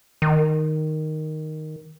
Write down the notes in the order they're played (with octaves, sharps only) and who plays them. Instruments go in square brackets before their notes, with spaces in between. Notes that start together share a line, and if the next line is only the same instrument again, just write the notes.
[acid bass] D#3